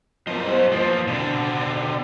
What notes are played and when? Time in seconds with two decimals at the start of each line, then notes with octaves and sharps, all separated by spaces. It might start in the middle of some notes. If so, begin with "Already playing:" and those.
0.27 F#2 B2 F3 D#5
0.46 G3 C5
0.72 E3 F3 A#3
1.08 B2 D3 C4